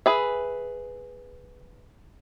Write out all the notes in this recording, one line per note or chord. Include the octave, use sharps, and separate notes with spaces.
G#4 B4 E5